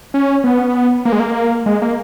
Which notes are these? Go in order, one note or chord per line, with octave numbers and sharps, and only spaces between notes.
C#4
B3
A#3
G#3
A#3
G#3
A#3